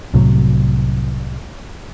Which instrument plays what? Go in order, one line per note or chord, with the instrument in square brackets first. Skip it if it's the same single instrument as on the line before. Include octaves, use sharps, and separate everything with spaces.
[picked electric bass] C2 A2 C3 F#3